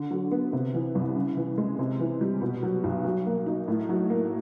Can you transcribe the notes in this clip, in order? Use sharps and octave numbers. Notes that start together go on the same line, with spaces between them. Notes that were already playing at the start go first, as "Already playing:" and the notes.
Already playing: D3
F#3
B3
C3
E3
C2
C#3
E3
G#3
C3
E3
G3
B2
F#3
B1
F#3
A#3
D#4
A2
F#3
A#3